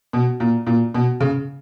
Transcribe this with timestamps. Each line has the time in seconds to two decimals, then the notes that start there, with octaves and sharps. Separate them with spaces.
0.13 B2
0.40 A#2
0.67 A#2
0.94 B2
1.21 C#3